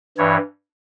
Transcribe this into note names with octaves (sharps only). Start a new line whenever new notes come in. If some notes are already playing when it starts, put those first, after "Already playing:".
G2 E3 C#5